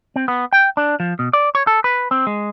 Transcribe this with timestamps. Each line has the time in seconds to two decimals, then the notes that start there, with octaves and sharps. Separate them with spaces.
0.16 C4
0.28 B3
0.53 G5
0.77 D4
1.00 F3
1.19 B2
1.33 D5
1.55 C#5
1.67 A4
1.84 B4
2.11 C4
2.27 G#3